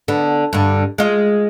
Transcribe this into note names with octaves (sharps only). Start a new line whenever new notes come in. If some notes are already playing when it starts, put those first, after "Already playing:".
D3 B3
G2 D3
G#3 F4